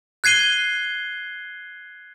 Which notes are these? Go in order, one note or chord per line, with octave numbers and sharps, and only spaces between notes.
F#6 G#6 C7 D#7 G7